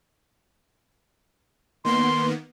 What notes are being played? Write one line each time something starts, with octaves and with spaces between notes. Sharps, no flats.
D#3 A#3 B3 C6